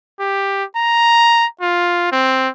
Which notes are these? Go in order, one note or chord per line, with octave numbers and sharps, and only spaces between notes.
G4
A#5
F4
C4